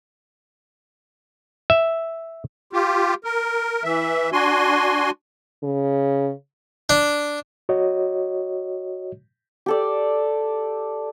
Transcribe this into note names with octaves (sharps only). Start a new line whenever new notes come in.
E5
F4 G4
A#4
E3 E5
D4 F#4 G#5 C6
C#3
D4
F#4 C#5 D#5
G4 A4 D5